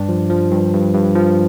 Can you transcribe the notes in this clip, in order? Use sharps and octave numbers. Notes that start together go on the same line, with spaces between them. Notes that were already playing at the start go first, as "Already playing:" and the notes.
Already playing: G2 D4
F3
F3
G2
G2
G2
F3